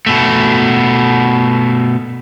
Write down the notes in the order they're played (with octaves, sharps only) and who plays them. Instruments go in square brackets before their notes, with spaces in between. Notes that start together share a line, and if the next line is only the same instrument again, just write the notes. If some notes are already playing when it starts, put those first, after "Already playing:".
[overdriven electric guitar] B2 A3